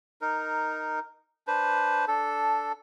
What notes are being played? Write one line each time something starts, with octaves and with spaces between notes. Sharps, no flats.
D#4 A#4
D4 B4 C5
D4 A4